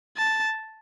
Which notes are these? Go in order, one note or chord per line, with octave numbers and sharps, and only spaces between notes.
A5